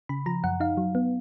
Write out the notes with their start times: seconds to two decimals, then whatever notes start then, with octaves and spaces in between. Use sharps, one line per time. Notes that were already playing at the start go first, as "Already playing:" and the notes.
0.09 C#3 B5
0.26 F3 A#5
0.44 F#2 F#5
0.60 D#4 F5
0.77 F#3
0.95 B3